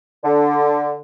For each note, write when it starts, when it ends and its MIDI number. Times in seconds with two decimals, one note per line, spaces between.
0.24 0.98 50